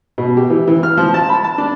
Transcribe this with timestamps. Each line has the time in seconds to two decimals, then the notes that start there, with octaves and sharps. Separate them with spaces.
0.18 B2
0.37 G4
0.50 E3
0.68 E3
0.83 F6
0.97 F3
1.14 A5
1.29 B5
1.44 A5
1.58 D4